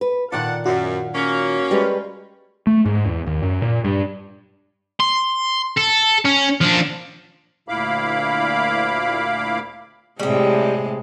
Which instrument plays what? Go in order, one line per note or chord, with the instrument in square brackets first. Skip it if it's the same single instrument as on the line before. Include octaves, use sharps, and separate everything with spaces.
[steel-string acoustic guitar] B4
[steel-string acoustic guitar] A#2 D#3 F4 [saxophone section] A4 D5 F#5
[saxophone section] F#2 [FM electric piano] F#4
[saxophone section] A#3 C#4
[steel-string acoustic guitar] G3 G#3 B4
[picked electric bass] A3
G#2
E2
D#2
F#2
A#2
G2
[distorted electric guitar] C6
A4
C#4
F3 D4
[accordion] D2 A#2 E4 F5 B5 D6
[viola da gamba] A2 C3 G#3 [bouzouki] G3 G4